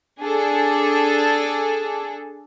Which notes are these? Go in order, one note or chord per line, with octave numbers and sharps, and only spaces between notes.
D4 G#4 A4